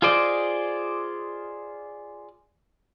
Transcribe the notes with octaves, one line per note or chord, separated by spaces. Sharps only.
F4 G#4 C5 D5 D#5